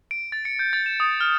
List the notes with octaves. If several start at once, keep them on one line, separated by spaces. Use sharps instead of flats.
D7
A6
C#7
G6
A6
E7
D#6
F6